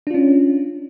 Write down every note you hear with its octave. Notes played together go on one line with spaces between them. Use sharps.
C#4 D4 F4